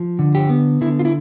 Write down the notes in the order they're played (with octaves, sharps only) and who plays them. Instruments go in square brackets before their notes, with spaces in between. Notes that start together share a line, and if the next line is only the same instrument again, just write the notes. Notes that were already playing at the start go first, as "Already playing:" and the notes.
Already playing: [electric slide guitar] F3
D3
G4
B3
D3 E4
F4
E4